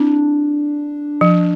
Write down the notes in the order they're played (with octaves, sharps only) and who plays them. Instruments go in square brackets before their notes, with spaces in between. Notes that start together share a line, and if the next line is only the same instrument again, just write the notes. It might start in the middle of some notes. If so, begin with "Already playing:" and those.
Already playing: [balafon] C4 E4 [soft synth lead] D4
[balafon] F3